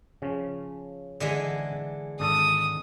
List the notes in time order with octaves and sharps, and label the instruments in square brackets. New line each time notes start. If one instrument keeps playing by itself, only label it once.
[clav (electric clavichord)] C#3 F3 C#4
[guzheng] D3 E3 G#3
[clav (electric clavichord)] G#1 D4 A4 [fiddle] D#6